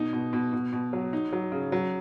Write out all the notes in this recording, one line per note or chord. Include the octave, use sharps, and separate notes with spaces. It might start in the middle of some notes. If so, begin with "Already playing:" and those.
Already playing: B2 D#4
B2
B2
B2
B2
F#3
D#4
F#3
C#3
F#3